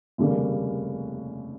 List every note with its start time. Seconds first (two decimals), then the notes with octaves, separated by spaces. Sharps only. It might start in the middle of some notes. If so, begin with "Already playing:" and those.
0.18 F1 D#2 C#3 G3 A#3